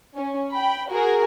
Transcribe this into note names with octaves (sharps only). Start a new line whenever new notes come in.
C#4
G5 B5
F#4 G#4 A#4